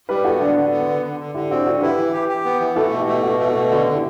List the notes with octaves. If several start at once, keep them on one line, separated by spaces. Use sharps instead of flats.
G3 G4 B4
B3 F#4 A4
D3 D4 F#4
D3
B3
D3
D3
D3
D3 E4 G4
C4 D4 F#4
D3 D4 F#4
E4 G4 B4
E3
G4
G4
B3
E3
A3 F#4 A4
B2
E4 G4
A3
B2 F#4 A4
A3
F#4 A4
B2
D3 F#4 A4
D3
E4 G4